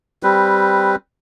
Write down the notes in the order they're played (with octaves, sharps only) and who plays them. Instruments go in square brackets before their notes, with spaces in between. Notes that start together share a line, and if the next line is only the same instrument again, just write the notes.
[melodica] G3 C4 B4